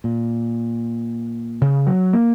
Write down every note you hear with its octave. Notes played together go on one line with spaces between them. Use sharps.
A#2
C#3
F#3
A#3